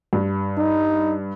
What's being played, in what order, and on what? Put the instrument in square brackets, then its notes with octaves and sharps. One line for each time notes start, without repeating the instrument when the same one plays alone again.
[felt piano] G2
[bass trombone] D#4